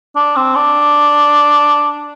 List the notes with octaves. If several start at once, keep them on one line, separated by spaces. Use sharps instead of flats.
D4
C4
D4